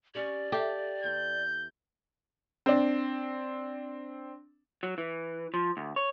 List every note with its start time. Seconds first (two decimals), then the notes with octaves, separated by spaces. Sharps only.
0.15 C#4 G4 D5
0.52 G4 A4 E5 F5
1.04 E2 G6
2.66 C4 D4
4.83 F#3
4.98 E3
5.54 F3
5.77 D2
5.96 C#5